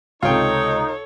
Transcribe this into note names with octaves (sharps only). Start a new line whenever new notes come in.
C#2 C3 D#4 F4 A4 C#5 G5